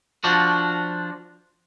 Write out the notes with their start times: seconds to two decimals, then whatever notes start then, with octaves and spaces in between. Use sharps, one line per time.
0.24 F3 D4 F#4